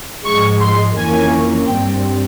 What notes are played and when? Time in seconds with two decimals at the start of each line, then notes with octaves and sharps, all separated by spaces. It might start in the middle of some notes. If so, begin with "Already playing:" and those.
0.25 G#2 F3 G#3 C#6
0.60 C6
0.96 F2 E3 A#3 C#4 G#5
1.67 G2 G3 C4 G5